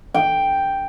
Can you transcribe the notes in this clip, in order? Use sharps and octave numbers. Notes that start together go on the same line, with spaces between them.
G5